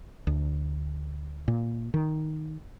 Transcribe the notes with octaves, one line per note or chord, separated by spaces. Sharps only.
D2
A#2
D#3